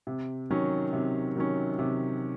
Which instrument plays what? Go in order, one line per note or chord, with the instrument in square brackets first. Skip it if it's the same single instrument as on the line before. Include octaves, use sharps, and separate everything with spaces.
[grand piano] C3
D#3 F#3 C#4
C3
D#3 F#3 C#4
C3